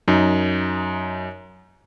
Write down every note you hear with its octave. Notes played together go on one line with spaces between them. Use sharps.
F#2 D#4